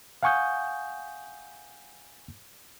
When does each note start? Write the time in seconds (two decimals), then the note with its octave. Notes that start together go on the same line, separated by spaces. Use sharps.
0.23 F5 F#5 G#5 C#6 D#6 G6